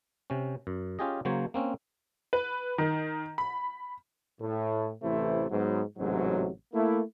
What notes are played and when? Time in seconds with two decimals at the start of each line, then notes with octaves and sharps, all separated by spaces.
0.30 C3 C#4
0.67 F#2
0.99 C#4 F4 G4 G#4 D#5
1.25 C#3 F#3 A#3 C5 C#5
1.54 A#3 C4 C#4
2.33 B4
2.78 D#3
3.38 B5
4.41 A2
5.03 A1 C3 E3 A3 E4 C5
5.50 G#2 F#3 B3
5.98 A1 G#2 C3 F#3
6.73 A3 A#3 E4